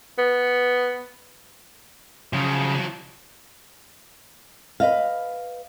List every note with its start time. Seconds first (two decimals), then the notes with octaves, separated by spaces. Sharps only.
0.18 B3
2.33 C#3 F3 F#3
4.80 B4 D#5 F5